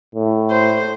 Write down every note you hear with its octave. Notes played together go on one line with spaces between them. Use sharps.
A2
C5